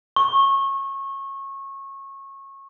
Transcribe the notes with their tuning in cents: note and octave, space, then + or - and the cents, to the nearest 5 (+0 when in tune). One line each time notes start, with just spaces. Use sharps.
C#6 -25